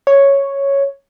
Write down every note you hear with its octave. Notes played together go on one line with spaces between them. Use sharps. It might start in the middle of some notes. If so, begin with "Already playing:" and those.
C#5